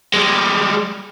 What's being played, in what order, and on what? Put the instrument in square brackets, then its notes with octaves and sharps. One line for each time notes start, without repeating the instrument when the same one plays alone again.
[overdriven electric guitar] G3 G#3